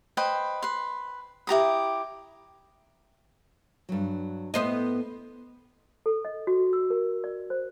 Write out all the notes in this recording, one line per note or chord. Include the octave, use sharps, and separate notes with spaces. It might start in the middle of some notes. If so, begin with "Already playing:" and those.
B4 C5 D#5 G5
B4 C6
E4 G4 A#5 D#6
G2 F#3
A2 A3 B3 C5 D#5
A4
D#5
F#4
E6
A#4
D5
C5